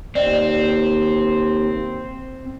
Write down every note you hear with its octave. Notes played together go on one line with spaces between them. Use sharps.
D#2 C4 D5 D#5 G5